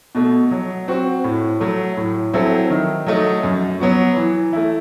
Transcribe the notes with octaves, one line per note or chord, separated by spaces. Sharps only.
B2 A3
F#3
C4 F#4
A2
F#3 A3
A2
F#3 C4 E4 A4
D#3
F#3 A3 D#4
F#2
F#3 B3 F#4
E3
A3 E4